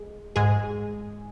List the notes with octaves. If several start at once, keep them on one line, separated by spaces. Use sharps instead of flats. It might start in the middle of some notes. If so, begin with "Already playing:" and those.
Already playing: G#3
G#2 G#3 G#4